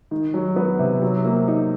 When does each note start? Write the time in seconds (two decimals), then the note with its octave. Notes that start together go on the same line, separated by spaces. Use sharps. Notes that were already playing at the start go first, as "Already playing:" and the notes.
0.11 D#3
0.34 F#3
0.56 B3
0.79 C3
1.02 F#3
1.25 A#3
1.48 D#4